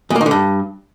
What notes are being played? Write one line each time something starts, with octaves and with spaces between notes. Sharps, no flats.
E2
A#3
D#3
D3
G2